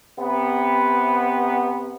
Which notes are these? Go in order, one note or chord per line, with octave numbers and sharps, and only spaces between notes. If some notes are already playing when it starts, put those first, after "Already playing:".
C3 B3